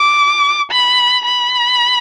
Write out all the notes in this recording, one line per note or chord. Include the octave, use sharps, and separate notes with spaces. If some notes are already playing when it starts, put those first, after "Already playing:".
Already playing: D6
B5
B5